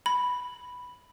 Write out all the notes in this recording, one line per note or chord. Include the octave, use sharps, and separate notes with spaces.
B5